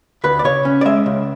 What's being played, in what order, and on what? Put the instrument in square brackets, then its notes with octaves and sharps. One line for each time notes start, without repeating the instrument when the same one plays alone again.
[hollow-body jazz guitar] D2 B4
D5
C#3 C#5
C#4
D5
G#3 E5
C#2